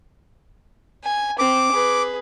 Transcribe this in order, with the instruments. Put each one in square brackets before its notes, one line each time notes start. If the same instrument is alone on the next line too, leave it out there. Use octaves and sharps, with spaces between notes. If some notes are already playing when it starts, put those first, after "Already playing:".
[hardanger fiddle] G#5
[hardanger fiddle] C4 [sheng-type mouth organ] D6
[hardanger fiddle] G#4 B4